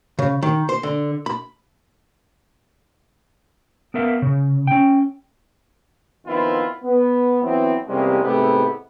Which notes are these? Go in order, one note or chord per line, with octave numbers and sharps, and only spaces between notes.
C#3
D#3
C5
D3
B5
B3 A#4 E5 F5
C#3
C#4 G5
D#3 F3 B3 C4 E4 F4
B3
E3 F#3 B3 C4
E2 C3 G3 G#3 A#3 C#4
G#2 C3 A3 B3 E4 G4